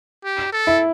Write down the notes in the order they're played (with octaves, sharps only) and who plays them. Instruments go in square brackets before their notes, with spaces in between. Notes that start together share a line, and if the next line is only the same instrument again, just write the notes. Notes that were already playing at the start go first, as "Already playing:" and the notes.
[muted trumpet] G4
A4
[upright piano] E4